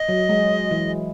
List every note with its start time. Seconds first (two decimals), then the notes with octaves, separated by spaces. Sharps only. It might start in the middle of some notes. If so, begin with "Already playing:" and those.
Already playing: D#5
0.09 F#3
0.29 G#3
0.71 E3